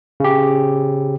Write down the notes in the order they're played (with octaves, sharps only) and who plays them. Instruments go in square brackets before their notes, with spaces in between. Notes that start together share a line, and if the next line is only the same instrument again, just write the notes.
[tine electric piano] C#3 G4